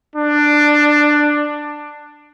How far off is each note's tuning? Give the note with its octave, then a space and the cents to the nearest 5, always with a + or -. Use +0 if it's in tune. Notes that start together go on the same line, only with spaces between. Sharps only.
D4 +10